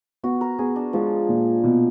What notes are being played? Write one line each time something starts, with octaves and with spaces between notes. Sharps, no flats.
B3 F#4
A#4
B3 G#4
D4
F3 G#3
A#2
B2